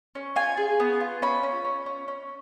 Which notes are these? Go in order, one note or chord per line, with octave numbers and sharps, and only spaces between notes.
C#4
F4 G#5
G#4
B3
F4
C#4 B5
C#4
C#4
C#4
C#4